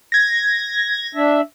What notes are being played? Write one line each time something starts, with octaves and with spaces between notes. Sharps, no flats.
G#6 A#6
D4 E5